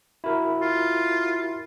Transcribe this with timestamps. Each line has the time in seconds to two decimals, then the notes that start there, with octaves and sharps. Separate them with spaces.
0.24 E4 F#4 A#4
0.61 F4